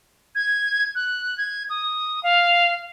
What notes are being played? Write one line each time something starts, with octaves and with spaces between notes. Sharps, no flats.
G#6
F#6
G#6
D#6
F5